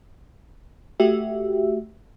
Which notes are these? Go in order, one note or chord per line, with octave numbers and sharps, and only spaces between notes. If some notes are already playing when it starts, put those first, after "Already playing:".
A3 F#4 G4 E5